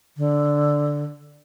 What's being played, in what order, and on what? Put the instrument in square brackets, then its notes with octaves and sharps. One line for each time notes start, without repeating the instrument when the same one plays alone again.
[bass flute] D3